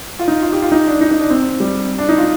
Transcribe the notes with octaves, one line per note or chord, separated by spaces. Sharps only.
F4
D#4
F4
G4
F4
D#4
D4
D#4
D#4
D4
C4
G3
D4
D#4
F4